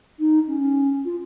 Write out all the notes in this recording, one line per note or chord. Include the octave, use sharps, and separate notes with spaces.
D#4
C#4
F4